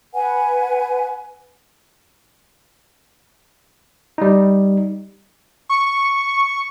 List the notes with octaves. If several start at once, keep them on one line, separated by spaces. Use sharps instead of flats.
B4 F#5 G#5
G3 D#4
C#6